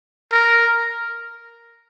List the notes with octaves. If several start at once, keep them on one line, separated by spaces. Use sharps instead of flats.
A#4